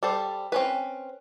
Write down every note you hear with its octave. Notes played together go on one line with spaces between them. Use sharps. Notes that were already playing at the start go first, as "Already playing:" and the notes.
G3 A4 C5
C4 C#4 B4